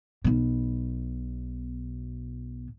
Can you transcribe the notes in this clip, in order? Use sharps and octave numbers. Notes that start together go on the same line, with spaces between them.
B1 B2